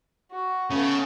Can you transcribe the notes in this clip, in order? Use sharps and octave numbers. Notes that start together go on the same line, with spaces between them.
F#4
C#3 A3 B3